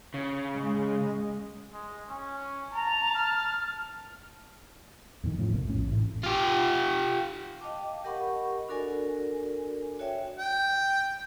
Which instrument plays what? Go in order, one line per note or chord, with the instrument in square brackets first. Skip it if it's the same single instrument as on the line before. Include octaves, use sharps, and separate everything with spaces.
[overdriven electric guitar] C#3
[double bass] G#3
[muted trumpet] G#3
C#4
[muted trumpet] A5 [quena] A#5
[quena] F6
[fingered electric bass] F2 A#2 D#3
A2 C#3 F3
C2 F2 A#3
A#1 A2 C#4
A1 A2
[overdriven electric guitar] F4 G4
[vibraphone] D#5 F5 G5 A5 D6
G4 A#4 D#5 F#5 B5 C#6
D4 F#4 A4 A#4 D5 G#5
F#4 C#5 D5 E5 G5
[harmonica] G5